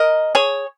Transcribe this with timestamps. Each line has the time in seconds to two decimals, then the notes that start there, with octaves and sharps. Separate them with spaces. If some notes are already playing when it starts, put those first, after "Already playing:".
Already playing: A#4 D#5
0.35 G#4 C#5